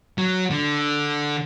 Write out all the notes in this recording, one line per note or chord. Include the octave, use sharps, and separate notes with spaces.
F#3
D3